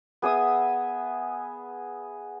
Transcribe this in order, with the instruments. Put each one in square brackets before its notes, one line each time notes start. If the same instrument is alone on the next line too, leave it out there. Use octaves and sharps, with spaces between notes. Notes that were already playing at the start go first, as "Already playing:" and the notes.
[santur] B3 G#4 E5 D#6